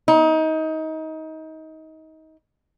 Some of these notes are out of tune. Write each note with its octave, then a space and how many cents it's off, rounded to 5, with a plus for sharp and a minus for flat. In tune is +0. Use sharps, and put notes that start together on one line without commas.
D#4 +25